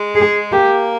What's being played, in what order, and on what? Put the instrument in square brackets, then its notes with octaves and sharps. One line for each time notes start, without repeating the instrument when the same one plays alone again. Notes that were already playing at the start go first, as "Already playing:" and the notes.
Already playing: [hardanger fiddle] G#3
[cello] G#4
[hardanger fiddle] A#3 [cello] G4